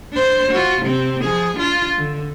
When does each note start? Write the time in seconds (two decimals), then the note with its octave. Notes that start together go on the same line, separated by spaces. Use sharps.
0.12 D4 C5
0.51 F4 F#4
0.81 C3 C4
1.24 F3 G#4
1.57 D4 F4
1.98 D3